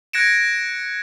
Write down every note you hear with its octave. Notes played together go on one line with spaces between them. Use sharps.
F#6 G#6 A#6 C#7 D7 E7